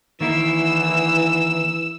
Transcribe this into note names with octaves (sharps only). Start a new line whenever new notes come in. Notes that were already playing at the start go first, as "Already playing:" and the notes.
D#3 E3 A#3 E4 E6